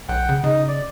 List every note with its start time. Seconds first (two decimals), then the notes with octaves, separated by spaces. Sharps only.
0.09 B1 F#5 G5
0.29 C#3
0.44 C#3 D#4
0.68 D5